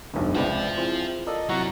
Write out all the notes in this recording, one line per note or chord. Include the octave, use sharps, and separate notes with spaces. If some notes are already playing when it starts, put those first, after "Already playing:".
F1 B1 G2
C#2 C3 B4 C5 D5 F5
C4 E4 F4 G#4
A4 A#4 D5 D#5 F5
F#2 C3 F#3 E4 F#5 A#5 C#6